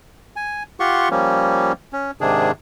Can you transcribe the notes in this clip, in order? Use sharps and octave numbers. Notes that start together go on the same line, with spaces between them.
G#5
F4 G4 F#5 C6 C#6
F3 G3 A#3 C#4
C#4
G#2 C3 D#3 D4 G#4